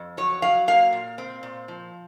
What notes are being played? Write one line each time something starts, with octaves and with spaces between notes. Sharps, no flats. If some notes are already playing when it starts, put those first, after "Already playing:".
Already playing: F2
F#3 C#5
F#3 F5
A#3 F5
A#2
C4
A#2
F3